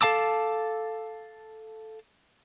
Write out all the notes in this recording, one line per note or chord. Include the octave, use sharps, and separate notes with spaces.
A4 F5 A5 D6 E6